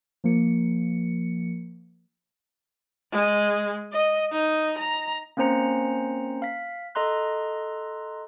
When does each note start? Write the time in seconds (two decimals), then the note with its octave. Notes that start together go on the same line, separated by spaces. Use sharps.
0.24 F3 A#3 C#7
3.12 G#3
3.93 D#5
4.32 D#4
4.78 A#5
5.37 A#3 C4 C#4 C5 A#5 C#7
6.42 F5 B6
6.95 A4 D#5 A#5 C6 F#6